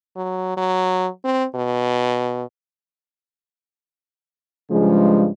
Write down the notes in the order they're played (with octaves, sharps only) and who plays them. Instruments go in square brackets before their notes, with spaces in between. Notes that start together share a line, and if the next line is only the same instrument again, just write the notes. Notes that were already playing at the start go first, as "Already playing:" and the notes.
[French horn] F#3
F#3
C4
B2
[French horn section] G2 C#3 F3 G#3